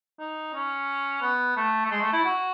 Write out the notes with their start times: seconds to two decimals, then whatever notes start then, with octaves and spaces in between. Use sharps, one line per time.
0.20 D#4
0.54 C#4
1.22 B3
1.57 A3
1.85 A3
1.91 G#3
2.02 A3
2.13 E4
2.25 F#4